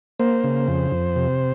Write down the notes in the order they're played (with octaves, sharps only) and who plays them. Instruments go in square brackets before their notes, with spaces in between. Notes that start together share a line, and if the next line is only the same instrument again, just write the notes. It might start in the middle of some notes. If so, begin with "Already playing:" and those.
[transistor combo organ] A#3 C5
C#3
F2
F2
C3